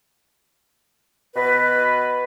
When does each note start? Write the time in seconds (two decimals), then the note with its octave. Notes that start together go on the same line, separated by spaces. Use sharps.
1.36 B2 B4